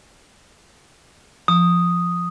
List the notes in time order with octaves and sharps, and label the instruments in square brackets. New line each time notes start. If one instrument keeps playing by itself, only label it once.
[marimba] F3 [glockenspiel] D#6